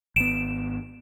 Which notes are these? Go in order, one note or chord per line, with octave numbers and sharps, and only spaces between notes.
G#1 B3 D7 E7